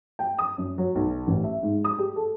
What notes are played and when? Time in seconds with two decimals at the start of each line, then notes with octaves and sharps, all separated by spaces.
0.19 G5
0.39 D#6
0.58 F#2
0.78 F#3
0.95 B1
1.27 A1
1.44 E5
1.63 G#2
1.84 D#6
1.98 G4
2.16 A4